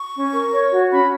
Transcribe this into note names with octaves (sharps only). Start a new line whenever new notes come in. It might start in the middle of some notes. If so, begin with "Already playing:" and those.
Already playing: C#6
C#4
A#4
C#5
F#4
C#4 B5